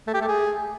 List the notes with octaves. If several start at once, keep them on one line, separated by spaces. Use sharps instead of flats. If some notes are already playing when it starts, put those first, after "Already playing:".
A3
G4
A3
G#4